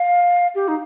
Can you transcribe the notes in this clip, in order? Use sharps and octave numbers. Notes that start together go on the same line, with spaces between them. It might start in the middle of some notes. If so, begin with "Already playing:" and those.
Already playing: F5
G4
D#4